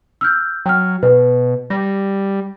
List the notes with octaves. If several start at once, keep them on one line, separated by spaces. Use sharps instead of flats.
E6 F6 G6
F#3 G5 F6
B2 B4
G3 A#6